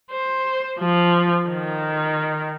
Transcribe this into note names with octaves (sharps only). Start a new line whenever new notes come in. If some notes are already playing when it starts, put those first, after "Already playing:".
C5
F3
D#3